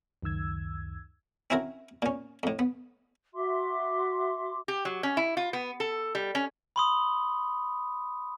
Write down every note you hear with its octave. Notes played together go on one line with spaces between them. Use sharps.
C#2 F#2 D#3 E6 G#6
C4 C#4 E4 F#4 A#4
A#2 C#4
F2 A2
B3
F#4 E5 C6 D6
G4
F#3
C#4
E4
F4
B3
A4
G3
C#4
B5 C6 D#6